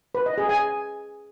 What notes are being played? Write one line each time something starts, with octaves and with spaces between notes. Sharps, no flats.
B4
D#5
G#4
G#5